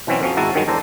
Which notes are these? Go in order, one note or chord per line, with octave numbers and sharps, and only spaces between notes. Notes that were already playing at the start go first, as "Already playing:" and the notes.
B2 E3 F#3 C4 C#4
F2 F3 F#3 C#4
G#1 G#3 E4 F#4 A5 A#5
G2 D#3 F#3 G#3
E2 D4 A4 C5 A#5